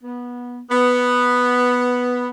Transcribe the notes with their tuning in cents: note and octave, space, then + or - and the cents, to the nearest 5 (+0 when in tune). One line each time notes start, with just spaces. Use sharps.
B3 -15
B3 +0